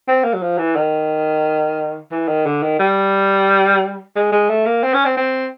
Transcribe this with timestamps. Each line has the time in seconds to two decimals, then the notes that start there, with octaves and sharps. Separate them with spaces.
0.08 C4
0.24 A#3
0.33 F#3
0.42 F3
0.58 E3
0.76 D#3
2.11 E3
2.28 D#3
2.46 D3
2.63 D#3
2.79 G3
4.16 G#3
4.32 G#3
4.49 A3
4.66 A#3
4.83 C4
4.94 C#4
5.05 C4
5.17 C4